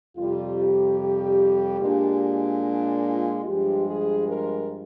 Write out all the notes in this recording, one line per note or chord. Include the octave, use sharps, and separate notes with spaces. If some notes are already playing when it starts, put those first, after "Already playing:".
F2 C3 G3 F4
G4
G4
A#2 G#3 D4
F4
G2 F3 G#3 G4
G#4
A#4